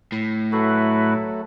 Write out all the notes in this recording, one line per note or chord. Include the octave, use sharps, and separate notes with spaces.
A2
F#3 A3 E4 F#4 A4 B4